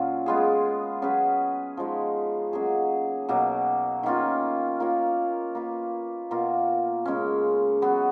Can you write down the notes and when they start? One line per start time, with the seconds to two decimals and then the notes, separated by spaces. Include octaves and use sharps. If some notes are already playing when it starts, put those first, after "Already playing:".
Already playing: A#2 F#3 C#4 F4
0.26 G#3 B3 F4 G#4
1.02 F#3 C#4 G#4 B4
1.77 F3 G#3 D#4
2.53 F#3 A#3 C#4 G#4
3.29 B2 F#3 A#3
4.03 D#3 A#3 C#4 F4
4.80 A#3 F4 A#4 C#5
5.55 A#3 F4 B4
6.31 B2 A#3 F4 A#4
7.05 C#3 G#3 C#4
7.82 F#3 B3 F#4